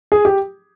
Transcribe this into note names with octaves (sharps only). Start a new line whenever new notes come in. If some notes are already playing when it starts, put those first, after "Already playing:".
G#4
G4